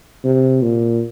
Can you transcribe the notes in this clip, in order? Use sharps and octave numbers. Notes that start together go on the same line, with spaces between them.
C3
A#2